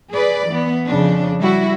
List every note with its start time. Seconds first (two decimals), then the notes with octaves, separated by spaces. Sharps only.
0.12 G#4 B4 D5
0.48 E3 B3
0.87 F2 C#3 D4
1.40 G3 E4 F#4